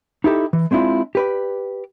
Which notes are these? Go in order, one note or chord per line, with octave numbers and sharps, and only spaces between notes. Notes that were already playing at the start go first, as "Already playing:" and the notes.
D#4 E4 G4 A4
E3
G#3 C4 D4 E4 F4
G4 B4 D5